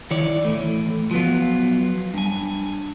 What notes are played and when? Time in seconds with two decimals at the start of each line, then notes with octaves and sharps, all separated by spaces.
0.11 D#3 E4 C#5 D5
0.45 A2 E3 A3
1.11 F3 F#3 B3 F4
2.14 G2 G#5